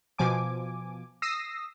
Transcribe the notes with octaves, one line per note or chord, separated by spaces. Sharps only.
B2 F3 G#5 D6
D#6 E6 A#6 C7